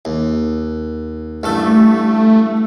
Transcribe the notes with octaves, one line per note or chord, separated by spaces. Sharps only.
D#2
A1 G2 A3 A4